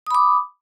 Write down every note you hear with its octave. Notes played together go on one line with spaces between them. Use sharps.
B5 D6 D#6